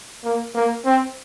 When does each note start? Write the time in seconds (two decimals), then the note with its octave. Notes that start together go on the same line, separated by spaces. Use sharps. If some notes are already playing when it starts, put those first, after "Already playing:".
0.25 A#3
0.55 A#3
0.85 C4